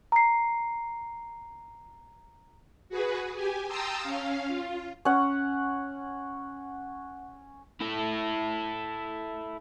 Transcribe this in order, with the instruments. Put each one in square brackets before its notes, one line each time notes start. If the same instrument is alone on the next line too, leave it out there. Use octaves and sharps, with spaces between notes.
[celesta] A#5 C7
[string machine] F#4 G#4 B4
G4 G#5
G5 A5 A#5 C6 D#6 E6
C#4 F5
F4
[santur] C#4 F#5
[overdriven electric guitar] E4 A4